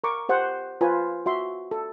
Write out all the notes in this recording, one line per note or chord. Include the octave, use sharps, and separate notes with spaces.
A#4 A#5 C#6 D6
G4 C5 F#5
F4 B4 C5 G#5
F#4 E5 C6
A4